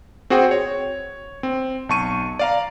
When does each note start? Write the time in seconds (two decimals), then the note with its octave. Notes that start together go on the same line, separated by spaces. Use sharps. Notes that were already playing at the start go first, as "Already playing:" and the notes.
0.30 C4 F#4 G#4 C5 G5
0.51 C#5
1.43 C4
1.89 B1 A5 C#6 D#7
2.39 D5 F5 A#5